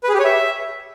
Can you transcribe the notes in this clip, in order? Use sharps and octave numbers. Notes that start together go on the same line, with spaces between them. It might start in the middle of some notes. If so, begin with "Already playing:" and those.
B4
G#4
G4
C#5
E5